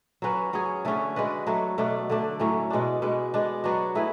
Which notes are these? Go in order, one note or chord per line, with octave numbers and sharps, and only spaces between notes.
F#3 C#4 F#4 B4
F#3 C#4 G#4
D3 A3 C#4 G#4
G#3 D4 F#4 B4
F#3 A3 D4
B2 A3 D4
D3 A3 D4
A2 F#3 A3 C#4
B2 G#3 D4
B2 G#3 B3 D4
G#3 B3 D4
F#3 B3 D4 F#4
A3 E4 G#4 B4